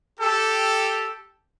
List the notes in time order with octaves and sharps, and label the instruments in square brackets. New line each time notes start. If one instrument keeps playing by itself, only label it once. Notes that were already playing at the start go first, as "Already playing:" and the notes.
[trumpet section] G4 A4